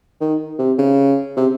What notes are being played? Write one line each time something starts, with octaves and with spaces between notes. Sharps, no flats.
D#3
C3
C#3
C3